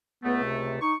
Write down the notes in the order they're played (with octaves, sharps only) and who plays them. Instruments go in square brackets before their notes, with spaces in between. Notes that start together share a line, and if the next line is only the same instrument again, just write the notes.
[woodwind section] C#2 A3 [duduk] B3
[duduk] C3
[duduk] D#4 [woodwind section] C#6